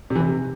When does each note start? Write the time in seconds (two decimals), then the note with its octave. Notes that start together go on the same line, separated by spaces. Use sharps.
0.10 C3
0.15 E3
0.20 C3